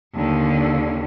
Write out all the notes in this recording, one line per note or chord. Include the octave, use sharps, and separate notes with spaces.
D#2 D3